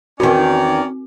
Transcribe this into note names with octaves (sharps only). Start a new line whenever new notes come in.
E2 D#3 C4 C#4 F#4 A#4 D5